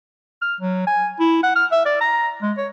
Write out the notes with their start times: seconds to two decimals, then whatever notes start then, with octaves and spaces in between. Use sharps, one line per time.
0.42 F6
0.60 F#3
0.87 G#5
1.20 E4
1.43 F#5
1.56 F6
1.72 E5
1.85 D5
2.01 A#5
2.42 G#3
2.58 C#5